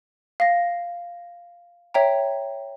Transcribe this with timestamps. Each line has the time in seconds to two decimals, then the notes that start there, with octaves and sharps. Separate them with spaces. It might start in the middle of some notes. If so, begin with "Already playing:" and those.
0.40 F5 A#6
1.94 C#5 E5 G5 A#5